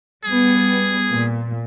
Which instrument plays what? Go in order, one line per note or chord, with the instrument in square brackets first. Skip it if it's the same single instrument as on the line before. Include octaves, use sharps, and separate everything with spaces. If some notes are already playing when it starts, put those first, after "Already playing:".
[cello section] G3 B3 [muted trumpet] G#4
[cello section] A#2